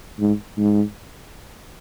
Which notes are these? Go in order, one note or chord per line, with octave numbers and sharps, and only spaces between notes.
G#2
G#2